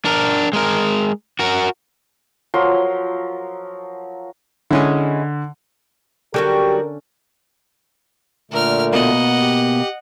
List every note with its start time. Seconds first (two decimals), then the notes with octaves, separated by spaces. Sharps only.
0.05 D4 A#4
0.53 G#3 A#4
1.39 F#4 A#4
2.54 F3 F#3 A#4 C6
4.71 D3 G#3 C#4 E4
6.34 D3 F#3 G3 C#4 F#4 G4 A#4 G5
8.51 A#2 D3 A3 A#4 F6
8.93 B2 A#3 D#5 F#5
9.40 G4